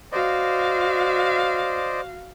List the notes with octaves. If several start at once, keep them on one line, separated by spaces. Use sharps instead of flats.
F#4 C5 D5 D#5 F5